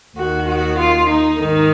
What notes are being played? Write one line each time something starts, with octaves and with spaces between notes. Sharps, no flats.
D#2 D#3 F#4
F#4
F4
D#4
G#2 D#3 D#4